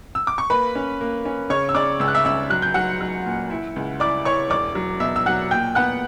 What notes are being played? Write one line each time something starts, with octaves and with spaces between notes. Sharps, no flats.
E6
D6
C#6
A#3 B4 B5
C#4
A#3
C#4
C#3 C#5 C#6
E6
C#3 D5 D6
C#2 E6
F#6
E5 E6
C#2 E5 E6
F#3 F#6
G6
F#3 F#5 F#6
F#3
A#2
E4
C#2
E4 D5 D6
E4 C#5 C#6
E1 D5 D6
F#3
B2 E5 E6
E6
F#3 F#5 F#6
A#2 G5 G6
B3 F#5 F#6